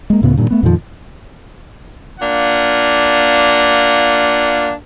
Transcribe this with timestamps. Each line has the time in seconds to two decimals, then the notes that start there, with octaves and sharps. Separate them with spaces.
0.10 G#3 A#3
0.22 C#2 A2 C#3 B3
0.38 G2 A#2 D#3
0.51 A3 B3
0.63 F2 A#2 D#3 F3
2.20 A#3 D4 F4 F#5